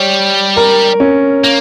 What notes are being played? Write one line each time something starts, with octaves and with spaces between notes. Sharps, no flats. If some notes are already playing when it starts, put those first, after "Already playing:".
Already playing: G3 C#5
A#4
C#4
A#3